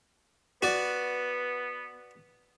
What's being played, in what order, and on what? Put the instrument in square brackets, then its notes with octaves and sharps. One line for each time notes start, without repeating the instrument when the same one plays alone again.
[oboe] B3 [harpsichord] F#4 D5 [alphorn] B4